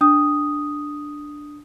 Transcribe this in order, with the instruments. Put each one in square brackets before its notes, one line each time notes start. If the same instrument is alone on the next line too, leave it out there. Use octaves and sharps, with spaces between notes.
[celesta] D4 D#6